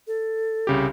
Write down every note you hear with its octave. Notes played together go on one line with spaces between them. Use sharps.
A4
C2 C#3 G4